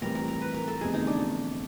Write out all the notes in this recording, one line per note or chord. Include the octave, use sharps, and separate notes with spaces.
A2 E3 G3 C4 A#4
A#4
A#4
B4
A#4
A4
G1 F2 C3 E3 A3 G#4
D#4
D4